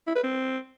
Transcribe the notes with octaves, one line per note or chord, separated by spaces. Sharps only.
E4
B4
C4